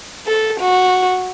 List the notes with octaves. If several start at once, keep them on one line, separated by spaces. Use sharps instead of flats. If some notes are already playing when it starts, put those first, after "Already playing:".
A4
F#4